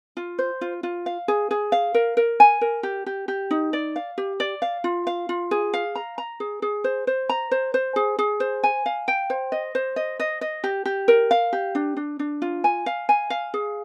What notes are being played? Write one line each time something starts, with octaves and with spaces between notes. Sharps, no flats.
F4
C5
F4
F4
F5
G#4
G#4
F5
A#4
A#4
G#5
A#4
G4
G4
G4
D#4
D5
F5
G4
D5
F5
F4
F5
F4
G#4
F5
A#5
A#5
G#4
G#4
C5
C5
A#5
C5
C5
G#4
G#4
C5
G#5
F5
G5
C5
D#5
C5
D#5
D#5
D#5
G4
G4
A#4
F5
G4
D4
D4
D4
F4
G#5
F5
G#5
F5
G#4